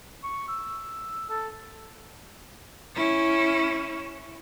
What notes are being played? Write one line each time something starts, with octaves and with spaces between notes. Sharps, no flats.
C#6
E6
A4
C#4 E4